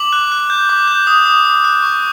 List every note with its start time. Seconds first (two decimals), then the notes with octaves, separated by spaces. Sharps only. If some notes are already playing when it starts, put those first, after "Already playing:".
Already playing: D6 F#7
0.13 F#6
0.32 F#6
0.50 G6
0.69 D6
0.88 G6
1.07 D#6
1.26 D#6
1.45 D#6
1.64 F#6
1.82 C#6